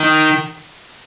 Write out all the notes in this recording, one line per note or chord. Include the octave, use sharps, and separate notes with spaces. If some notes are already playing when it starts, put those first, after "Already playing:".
Already playing: D#3